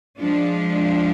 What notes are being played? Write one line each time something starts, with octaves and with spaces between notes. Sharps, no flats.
F3 G#3 D4